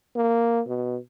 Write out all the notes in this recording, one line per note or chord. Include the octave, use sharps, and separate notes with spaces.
A#3
B2